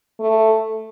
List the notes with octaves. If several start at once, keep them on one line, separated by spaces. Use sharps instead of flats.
A3